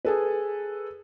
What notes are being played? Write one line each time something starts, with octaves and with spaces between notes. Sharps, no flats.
G#4 A4 B4